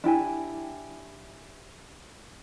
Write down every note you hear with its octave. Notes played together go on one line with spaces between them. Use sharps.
D4 E4 G4 G#5